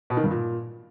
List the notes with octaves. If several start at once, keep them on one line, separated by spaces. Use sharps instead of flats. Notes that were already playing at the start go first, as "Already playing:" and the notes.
B2
D#3
G2
A#2